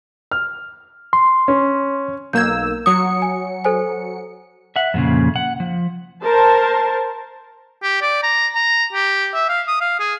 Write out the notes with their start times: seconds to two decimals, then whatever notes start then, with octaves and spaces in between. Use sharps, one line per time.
0.31 F6
1.13 C6
1.48 C#4
2.33 B1 A#3 E6 G6 G#6
2.86 F#3 D#6 C#7
3.22 G#5
3.64 A4 C5 G#5
4.76 E5 F#5
4.94 F2 A#2 C#3
5.36 F#5
5.60 F3
6.24 A#4 C5 A5
7.83 G4
8.02 D5
8.23 A#5
8.55 A#5
8.93 G4
9.34 E5
9.49 F5
9.68 D#6
9.81 F5
10.00 G#4